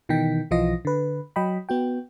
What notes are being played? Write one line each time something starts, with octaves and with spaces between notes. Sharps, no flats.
B2 D#3 E3 D#4 G5 B6
B1 E3 F3 F4 D#5 A#6
D3 B4
F#3 D#5 G5 B5
B3 F#4 G5